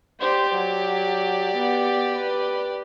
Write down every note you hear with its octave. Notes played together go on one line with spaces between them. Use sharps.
G4 C5 D5
F#3
B3
B4